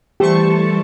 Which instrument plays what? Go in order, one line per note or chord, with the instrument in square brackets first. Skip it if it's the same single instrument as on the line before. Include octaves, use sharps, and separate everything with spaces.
[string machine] E3 G3 A5 [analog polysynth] A3 C5 C#6 [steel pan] G4